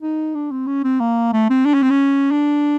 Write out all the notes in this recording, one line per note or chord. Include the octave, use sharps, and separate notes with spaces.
D#4
D4
C4
C#4
C4
A#3
A3
C4
D4
C#4
C4
C#4
D4